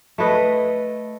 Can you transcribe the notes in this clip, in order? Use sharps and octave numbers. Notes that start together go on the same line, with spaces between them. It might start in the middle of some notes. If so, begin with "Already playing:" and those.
A3 E4 B4 D#5